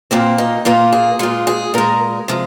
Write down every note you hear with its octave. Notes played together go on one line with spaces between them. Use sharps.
A#2 A#3 C4
D#4
A#2 A#3 F4
G#4
A#2 G#3 F4
G#4
A#2 G#3 A#4
C3 F3 G#3